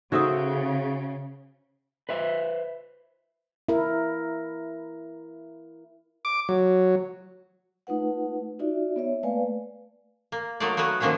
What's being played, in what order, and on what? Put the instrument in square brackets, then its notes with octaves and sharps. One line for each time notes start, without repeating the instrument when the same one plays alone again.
[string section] C#3 [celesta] D#4 A4 D#6 [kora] F#4 C5 E5
[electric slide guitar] B4 C5 E5
[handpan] E4 A#4
[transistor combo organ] D6
F#3
[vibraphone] A3 D#4 F4 B4 F#5
D#4 F4 F#4 D5 E5
B3 C#5 E5
A3 A#3 B4 D5 F5 G#5
[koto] A#3
F#3 A3 A#3 D#4 F4 D5
A3 B3 F#4 B4 C#5
D#3 F3 A#3 B3 C#4 D4